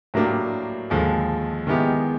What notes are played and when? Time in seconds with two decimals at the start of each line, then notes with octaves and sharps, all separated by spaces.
0.14 A2 F#3 A#3 D4 G4
0.90 D#2 D3 F3 G#3
1.67 D#3 G#3 B3 E4 G4